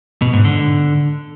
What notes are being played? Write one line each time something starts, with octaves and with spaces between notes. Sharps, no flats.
B2
G#2
D3